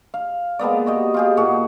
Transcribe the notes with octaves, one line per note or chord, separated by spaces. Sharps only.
F5
G#3 A#3 B3 D5
F#4 G4 D#5
F4 G4 G#4
A#2 F#4 G#4 F#5